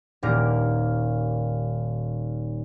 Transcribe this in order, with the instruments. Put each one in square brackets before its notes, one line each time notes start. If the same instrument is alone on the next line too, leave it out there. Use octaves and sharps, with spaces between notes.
[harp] D#1 A#3 G4 A#4